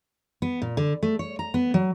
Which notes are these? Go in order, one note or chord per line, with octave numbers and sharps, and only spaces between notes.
B3
A#2
D3
A3
C#5
A#5
B3
F#3